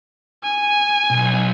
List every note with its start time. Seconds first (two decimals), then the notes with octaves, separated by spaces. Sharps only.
0.44 G#5
1.10 B1